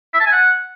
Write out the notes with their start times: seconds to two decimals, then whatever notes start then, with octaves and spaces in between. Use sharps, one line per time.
0.14 E5
0.20 A5
0.26 G#5
0.32 F#5